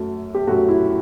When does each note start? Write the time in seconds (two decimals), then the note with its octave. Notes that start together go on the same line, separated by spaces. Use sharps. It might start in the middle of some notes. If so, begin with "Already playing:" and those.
Already playing: F#2 F#3 A3
0.35 G4
0.47 F#2 F#3 A3 F#4
0.69 E4